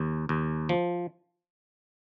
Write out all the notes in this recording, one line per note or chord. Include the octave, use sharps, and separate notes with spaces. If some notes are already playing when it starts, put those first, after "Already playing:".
Already playing: D#2
D#2
F3